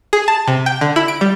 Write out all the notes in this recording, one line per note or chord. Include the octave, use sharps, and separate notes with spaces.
G#4
A5
C3
G5
D3
E4
D7
G3